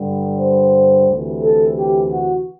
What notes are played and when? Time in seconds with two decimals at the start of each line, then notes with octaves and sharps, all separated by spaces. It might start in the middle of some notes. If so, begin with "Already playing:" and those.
Already playing: G2 D3 G3
0.39 C5
1.08 D2 C3 E3
1.43 A4
1.77 G4
2.11 F#4